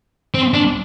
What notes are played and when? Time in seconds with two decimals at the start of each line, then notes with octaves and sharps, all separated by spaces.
0.34 C4
0.53 D4